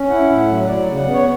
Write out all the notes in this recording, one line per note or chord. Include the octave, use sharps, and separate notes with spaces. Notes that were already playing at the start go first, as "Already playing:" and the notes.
Already playing: C#4
E4 F#5
A2
F#5
F#3
F#3 D5
C#3
F#5
B3
C#5